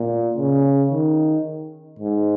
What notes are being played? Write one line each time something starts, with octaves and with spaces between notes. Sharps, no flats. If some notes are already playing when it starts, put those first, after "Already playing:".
Already playing: A#2
C#3
D#3
G#2